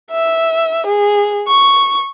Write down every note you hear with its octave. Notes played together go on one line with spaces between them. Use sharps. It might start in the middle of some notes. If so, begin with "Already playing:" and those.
E5
G#4
C#6